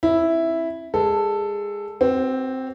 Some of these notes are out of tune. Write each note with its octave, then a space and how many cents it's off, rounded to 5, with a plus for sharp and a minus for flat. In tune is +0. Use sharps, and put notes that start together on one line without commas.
C4 +40 E4 +0
G#3 -20 A4 +5
C4 +0 F#4 +35